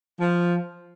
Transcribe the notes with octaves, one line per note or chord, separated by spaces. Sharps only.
F3